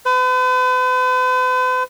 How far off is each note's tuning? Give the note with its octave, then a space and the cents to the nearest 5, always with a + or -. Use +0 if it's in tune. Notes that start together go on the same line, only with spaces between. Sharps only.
B4 +45